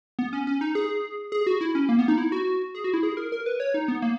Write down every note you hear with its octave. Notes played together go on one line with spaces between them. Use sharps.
B3
C#4
C#4
D#4
G#4
G#4
F#4
E4
C#4
A#3
B3
D#4
E4
F#4
G#4
F#4
E4
G#4
A#4
A#4
B4
C#5
D#4
B3
A#3